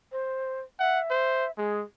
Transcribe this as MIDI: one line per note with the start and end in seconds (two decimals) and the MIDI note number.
0.12 0.60 72
0.79 1.51 76
0.79 1.00 78
1.10 1.45 72
1.57 1.82 56
1.57 1.80 68